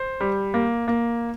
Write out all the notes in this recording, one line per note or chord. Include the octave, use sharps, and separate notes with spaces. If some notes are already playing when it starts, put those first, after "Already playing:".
Already playing: C5
G3
A#3
A#3